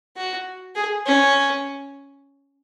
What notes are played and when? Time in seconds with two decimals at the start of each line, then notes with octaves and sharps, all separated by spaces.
0.17 F#4
0.76 G#4
1.06 C#4